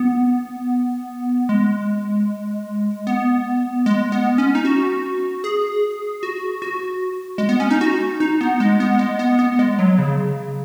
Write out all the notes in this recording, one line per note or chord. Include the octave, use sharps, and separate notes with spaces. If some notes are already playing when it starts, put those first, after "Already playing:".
Already playing: B3
G#3
B3
G#3
B3
C#4
D#4
F#4
G#4
F#4
F#4
G#3
B3
C#4
D#4
F#4
D#4
B3
G#3
B3
G#3
B3
B3
G#3
F#3
C#3